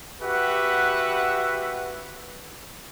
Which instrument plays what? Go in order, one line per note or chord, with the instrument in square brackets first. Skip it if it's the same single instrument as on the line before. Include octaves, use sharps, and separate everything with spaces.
[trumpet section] F#4 G4 B4 E5 F#5